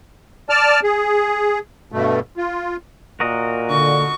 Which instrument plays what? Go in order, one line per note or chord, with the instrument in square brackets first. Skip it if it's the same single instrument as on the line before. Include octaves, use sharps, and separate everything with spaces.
[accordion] D5 A5 F6
G#4
G2 B2 A3
F4
[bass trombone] A#2 [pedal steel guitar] F#4 A#4 D#5
[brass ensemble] D3 [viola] C#6